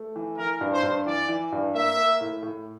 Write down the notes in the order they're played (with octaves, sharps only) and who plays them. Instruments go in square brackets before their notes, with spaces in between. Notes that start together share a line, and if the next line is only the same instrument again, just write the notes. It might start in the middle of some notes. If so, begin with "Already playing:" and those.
Already playing: [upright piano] A3
E3
[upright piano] E3 [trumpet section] A#4
[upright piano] G2
[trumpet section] C5
[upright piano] G2
[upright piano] E3 [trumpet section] D5
[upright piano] E3
G2
[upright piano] A#3 [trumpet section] E5
[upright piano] A#3
A2
A2